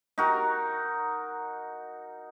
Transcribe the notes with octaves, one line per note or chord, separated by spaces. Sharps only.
D#4 F#4 A#4